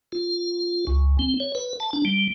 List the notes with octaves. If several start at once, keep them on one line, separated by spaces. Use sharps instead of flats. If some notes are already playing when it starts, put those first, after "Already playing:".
F4
C#2
C4
C#5
B4
A5
D4
G3